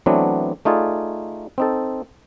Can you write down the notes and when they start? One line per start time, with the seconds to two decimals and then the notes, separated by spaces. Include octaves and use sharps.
0.06 E3 F#3 A3 B3 C4 D4
0.65 A3 D#4 F4 G#4 D5
1.58 C4 D#4 A4